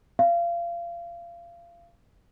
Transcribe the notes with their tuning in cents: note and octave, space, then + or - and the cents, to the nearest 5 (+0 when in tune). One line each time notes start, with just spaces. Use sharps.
F5 -30